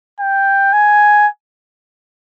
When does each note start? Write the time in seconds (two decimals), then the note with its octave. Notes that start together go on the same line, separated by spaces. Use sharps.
0.20 G5
0.73 G#5